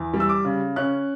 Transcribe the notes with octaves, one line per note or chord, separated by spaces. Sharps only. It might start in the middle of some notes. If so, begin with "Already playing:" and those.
Already playing: E2
G3
E6
D6
C#3
C#4 F#6